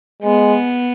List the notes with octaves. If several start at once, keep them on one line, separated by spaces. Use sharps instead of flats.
G#3 B3